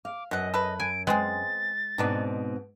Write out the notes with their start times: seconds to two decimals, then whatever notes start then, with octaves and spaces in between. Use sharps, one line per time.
0.05 F5 D6
0.31 F#2 B2 D#5 F#5
0.54 A4 B4
0.80 G#5 D7
1.07 G#3 B3 C4 G#4 A6
1.98 G#2 B2 B3 C4 D4 D#4